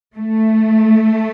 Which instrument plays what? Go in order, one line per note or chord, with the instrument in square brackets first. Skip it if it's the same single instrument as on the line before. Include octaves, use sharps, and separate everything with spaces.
[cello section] A3